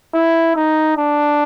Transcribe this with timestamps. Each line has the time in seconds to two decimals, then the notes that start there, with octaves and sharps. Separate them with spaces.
0.14 E4
0.56 D#4
0.97 D4